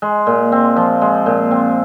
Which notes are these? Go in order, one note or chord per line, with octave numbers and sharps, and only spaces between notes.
G#3
A#2
C4
F3
G#3
A#2
C4